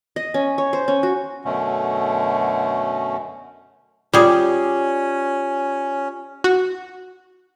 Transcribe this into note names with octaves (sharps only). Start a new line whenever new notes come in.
D#5
C#4
C#5
C5
C#4
F#4
F#2 B2 D3 A3 C#4
G3 C#4 F4 G4 G#4 D5
F#4